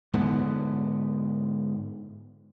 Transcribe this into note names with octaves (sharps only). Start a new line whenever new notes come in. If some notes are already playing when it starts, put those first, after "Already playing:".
G#2 D3 B3